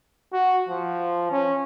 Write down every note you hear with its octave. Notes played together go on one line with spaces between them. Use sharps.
F#4
F3
C#4